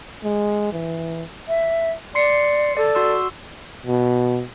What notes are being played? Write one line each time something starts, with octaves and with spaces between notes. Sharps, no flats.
G#3
E3
E5
D5 C6 C7 C#7
A4 D5
F#4 C6 E6
B2